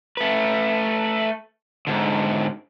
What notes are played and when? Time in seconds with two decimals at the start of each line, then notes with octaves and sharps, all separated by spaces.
0.17 A3 B4
1.87 G#2 D3